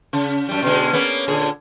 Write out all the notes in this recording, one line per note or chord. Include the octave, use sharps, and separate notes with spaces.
C#3
F#2 G3
B2 D3 G#3
A#3 B3 C#4
A#2 D3 G#4